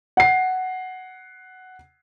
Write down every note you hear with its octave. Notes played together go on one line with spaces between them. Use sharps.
F#5 C7